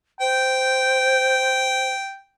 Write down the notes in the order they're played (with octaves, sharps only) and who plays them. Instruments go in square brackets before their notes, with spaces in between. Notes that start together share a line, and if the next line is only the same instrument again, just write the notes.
[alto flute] C5 [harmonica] G5